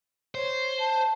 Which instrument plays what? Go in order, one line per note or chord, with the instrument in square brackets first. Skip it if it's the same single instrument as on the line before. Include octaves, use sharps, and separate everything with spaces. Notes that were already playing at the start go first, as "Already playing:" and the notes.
[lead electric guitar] C5 [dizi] C#5
[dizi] A5